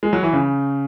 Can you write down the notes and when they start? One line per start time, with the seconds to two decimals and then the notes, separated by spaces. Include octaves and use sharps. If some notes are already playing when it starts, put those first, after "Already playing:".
0.03 G#3
0.13 F#3
0.23 E3
0.33 C#3